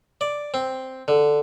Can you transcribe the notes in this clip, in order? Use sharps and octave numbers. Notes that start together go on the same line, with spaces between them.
D5
C4
D3